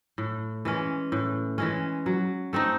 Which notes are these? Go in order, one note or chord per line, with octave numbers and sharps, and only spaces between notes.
A2
E3 G#3 C#4
A2
E3 G#3 C#4
F#3
A3 C4 D#4